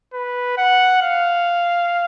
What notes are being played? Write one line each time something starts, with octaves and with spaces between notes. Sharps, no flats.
B4
F#5
F5